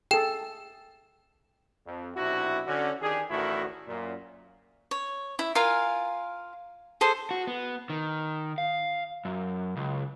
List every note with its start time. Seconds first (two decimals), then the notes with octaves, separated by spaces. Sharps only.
0.11 G#4 A4 G5 E7
1.86 F2
2.16 B1 C3 D4 E4 F#4
2.66 D3 C#4 F#4
3.01 D#3 D4 G4 G#4
3.30 A1 D2 D#3 A3 E4 F#4
3.88 F#2 A#2
4.91 C#5
5.39 E4 E5
5.55 F4 A#4 F5 G#5
7.01 G#4 A4 C5
7.31 F#4
7.47 B3
7.90 D#3
8.58 F5
9.25 F#2
9.76 C#2